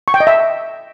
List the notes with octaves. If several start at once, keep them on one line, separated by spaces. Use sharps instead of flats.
C#6
G5
D#5
E5